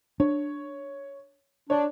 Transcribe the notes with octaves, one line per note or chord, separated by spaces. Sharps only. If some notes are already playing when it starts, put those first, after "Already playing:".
D4 C#5
D4 C#5